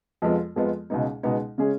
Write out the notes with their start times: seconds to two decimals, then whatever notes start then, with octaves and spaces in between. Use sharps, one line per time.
0.22 F2 F3 G#3 B3 F4
0.56 F2 F3 G#3 B3 F4
0.90 C#2 B2 G#3 B3 D#4
1.23 C#2 B2 G#3 B3 D#4
1.58 C#3 G#3 C#4 G#4